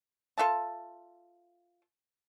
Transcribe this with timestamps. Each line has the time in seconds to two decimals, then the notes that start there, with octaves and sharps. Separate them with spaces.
0.38 F4 A4 E5 A5